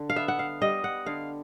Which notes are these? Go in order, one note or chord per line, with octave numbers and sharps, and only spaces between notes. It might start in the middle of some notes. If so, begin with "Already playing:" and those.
Already playing: D3
F5
B3 E5
F#5
F5
G3 D#5
F#5
D3 F5